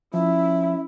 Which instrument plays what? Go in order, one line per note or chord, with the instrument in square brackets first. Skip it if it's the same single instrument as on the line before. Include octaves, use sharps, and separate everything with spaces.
[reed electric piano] F3 [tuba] C#4 [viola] E4 [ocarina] E5